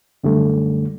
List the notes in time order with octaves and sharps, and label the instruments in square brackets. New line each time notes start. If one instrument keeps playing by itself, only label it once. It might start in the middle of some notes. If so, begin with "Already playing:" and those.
[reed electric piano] F#2 D3 G3 A3